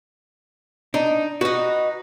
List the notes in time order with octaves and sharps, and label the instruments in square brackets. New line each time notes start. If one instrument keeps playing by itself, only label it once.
[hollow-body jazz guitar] D4 [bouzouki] D#4
[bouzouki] D#4 B4 [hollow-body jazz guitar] F#4